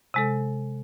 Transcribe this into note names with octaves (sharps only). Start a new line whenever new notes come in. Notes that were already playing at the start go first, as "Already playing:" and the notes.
C3 G#3 A4